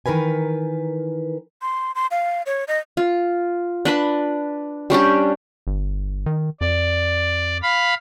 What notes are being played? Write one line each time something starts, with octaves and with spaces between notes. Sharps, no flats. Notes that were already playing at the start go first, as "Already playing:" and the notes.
D#3 E3 A#4 B4 G#5
C6
C6
F5
C#5
D#5
F4
D4 B4 B5
G3 C#4 D4 G4
G1
D#3
F2 D5
F5 B5